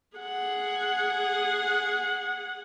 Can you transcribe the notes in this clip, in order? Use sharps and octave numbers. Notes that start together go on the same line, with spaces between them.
G#4 F#5